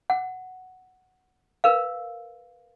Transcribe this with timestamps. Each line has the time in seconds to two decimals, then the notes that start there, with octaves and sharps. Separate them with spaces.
0.10 F#5
1.64 A#4 B4 F5